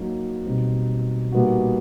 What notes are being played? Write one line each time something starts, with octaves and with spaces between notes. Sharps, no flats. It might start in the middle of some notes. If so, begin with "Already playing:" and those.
Already playing: F#3 A#3 D#4 F#4
B2 G3 C4 D#4
A#2 G3 B3 D#4 F#4